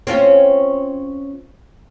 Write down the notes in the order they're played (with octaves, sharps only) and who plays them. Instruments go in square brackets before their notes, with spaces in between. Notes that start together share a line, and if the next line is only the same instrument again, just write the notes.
[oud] C4 C#4 F4